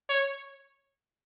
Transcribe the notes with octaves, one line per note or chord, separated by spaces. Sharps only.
C#5